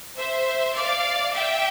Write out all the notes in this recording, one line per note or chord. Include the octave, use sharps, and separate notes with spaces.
C5 E5
D5 F5
E5 G5